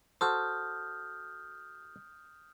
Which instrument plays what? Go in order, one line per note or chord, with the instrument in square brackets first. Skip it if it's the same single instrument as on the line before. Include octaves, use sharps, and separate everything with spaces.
[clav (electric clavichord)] F#4 A4 C5 [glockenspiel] D#6 F6 G6